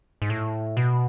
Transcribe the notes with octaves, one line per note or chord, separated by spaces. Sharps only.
G#2
A2
B2